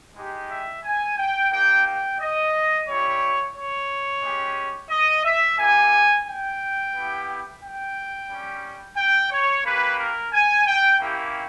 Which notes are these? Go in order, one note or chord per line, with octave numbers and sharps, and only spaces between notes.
G#3 D#4 G4
E5
G#5
G5
A#3 D#4 G4 G5
G5
D#5
G3 C#4 E4 G4 C#5
C#5
G#3 C#4 G4
D#5
E5
A#3 E4 G4 G#5
G5
B3 E4 G4
G5
G3 C#4 G4
G5
C#5
A#3 C#4 G4 B4
A#4
G#5
G5
A#3 C#4 E4 G4